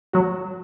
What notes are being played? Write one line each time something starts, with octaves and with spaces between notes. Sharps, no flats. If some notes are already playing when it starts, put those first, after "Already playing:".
F#3 F#4